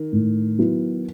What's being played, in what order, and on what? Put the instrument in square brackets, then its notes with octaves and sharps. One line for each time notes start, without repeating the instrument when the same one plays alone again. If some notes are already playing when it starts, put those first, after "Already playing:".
Already playing: [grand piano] D#3
[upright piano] A2
F#3 B3 E4